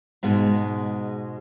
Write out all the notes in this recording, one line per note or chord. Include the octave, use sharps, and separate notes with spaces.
G#2 B2 G#3